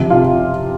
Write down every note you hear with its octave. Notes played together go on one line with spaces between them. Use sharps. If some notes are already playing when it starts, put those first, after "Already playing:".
Already playing: C3 F3
F4